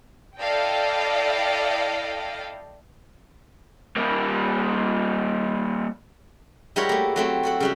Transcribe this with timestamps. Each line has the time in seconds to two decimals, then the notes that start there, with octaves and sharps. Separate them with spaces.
0.38 E4 A4 D5 D#5 F5 G5
3.97 G3 A#3
6.76 G3 G#3 E4 F#4 A#4 C#5
6.89 A3 A#3
7.16 F#3 A3 C4
7.43 F#4 A4 F#5
7.60 C#3 G3 F#4